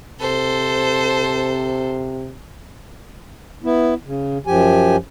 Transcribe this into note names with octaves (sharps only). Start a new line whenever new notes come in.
C3 A4 C5
B3 E4
C#3
F#2 F3 G4 G#5